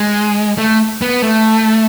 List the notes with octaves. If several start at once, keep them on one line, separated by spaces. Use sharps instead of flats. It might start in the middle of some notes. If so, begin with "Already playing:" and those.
Already playing: G#3
A3
B3
A3